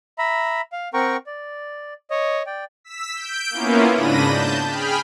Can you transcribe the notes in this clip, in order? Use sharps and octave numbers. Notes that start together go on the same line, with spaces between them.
E5 A#5 B5
F5
C4 A#4 F#5 G5 A#5 C#6
D5
C#5 D#5
D5 G5
E6 B6
G6 D7
A#3 B3 C#4 E4 F4
G#2 C#3 D4 B5 A#6 D#7
A5 G6
G#4 G5 B5 F6